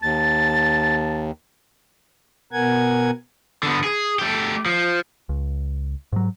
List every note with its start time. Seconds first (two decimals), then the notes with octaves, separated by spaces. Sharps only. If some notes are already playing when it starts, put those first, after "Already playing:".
0.02 D#2 A5 A6
2.52 B2 B3 A#4 F#5 G#5 G#6
3.63 D3 B3
3.84 G#4
4.19 A3 G4
4.66 F3
5.29 C#2
6.13 G#2 F#3